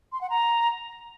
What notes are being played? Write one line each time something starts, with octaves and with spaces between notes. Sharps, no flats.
C6
F#5
A#5